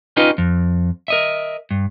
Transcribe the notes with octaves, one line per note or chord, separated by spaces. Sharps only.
C#4 D#4 F4 G4 B4 D#5
F2
A#4 D#5 E5
G2